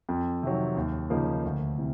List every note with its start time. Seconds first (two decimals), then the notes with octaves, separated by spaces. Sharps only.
0.09 F2
0.43 C3 D#3 F#3
0.77 D#2
1.10 C#3 F3 A#3 D#4
1.45 D2
1.78 C3 E3